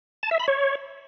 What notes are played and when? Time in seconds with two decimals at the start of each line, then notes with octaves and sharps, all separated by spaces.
0.23 A5
0.31 E5
0.39 B5
0.48 C#5